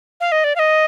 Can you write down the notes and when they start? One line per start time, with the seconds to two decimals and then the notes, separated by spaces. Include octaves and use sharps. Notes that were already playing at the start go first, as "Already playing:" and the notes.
0.21 F5
0.32 D#5
0.44 D5
0.56 F5
0.59 D#5